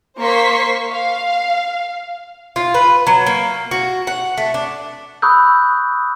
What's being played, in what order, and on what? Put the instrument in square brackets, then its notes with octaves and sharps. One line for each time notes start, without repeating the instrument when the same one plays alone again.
[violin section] A#3 C5 C6 C#6 B6
F5
[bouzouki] F4
B4
F#3
A#3
F#4
F#5
A3
D4
[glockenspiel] B5 C#6 D#6 E6 F#6 G6